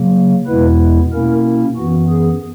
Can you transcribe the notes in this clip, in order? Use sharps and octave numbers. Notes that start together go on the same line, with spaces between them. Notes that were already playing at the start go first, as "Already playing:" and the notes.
Already playing: C#3 F#3 A#3
E2 B2 G#3 B3 E4 B4
B2 A#3 C#4 E4 A#4
F#2 E3 B3 F#4
G#4